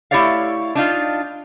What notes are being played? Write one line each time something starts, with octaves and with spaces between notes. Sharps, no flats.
A3 E4 G4 C#5 D5 F5
D4 D#4 F4